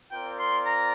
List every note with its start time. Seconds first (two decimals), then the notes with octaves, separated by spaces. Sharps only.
0.11 C4 F4 A#4 D5 G5
0.39 C6
0.65 A#5